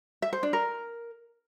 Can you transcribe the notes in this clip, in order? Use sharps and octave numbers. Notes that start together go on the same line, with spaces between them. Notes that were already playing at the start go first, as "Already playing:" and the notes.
E5
C5
D4
A#4